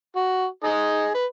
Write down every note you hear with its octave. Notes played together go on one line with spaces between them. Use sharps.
F#4
D#4 G#4 D#5
B4